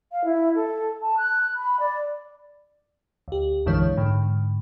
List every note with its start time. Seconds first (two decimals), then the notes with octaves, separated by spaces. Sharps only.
0.11 F5
0.24 E4
0.54 A4
1.01 A5
1.17 F#6
1.56 B5
1.79 D5
3.28 D2 G4
3.66 B1 F#2 D3 E3 G#3 C#5
3.97 G#2 D3